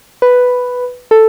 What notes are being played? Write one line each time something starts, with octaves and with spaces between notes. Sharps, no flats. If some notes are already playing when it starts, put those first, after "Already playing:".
B4
A4